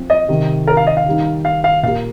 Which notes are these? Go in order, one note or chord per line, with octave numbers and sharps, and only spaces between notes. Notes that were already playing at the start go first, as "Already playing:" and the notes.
Already playing: F3 C4
D#5
C3 D#3 G3
A#4
F5
D#5
F5
D#3 G3 D#4
F5
F5
A#2 A#3 G4 F5